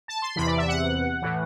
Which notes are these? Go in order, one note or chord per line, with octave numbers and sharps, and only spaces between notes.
A5
C6
E2 C3 E3 B5
D5
E5
F#5
A2 E3